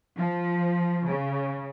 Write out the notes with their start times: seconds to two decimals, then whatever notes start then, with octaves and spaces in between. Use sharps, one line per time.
0.16 F3
1.07 C#3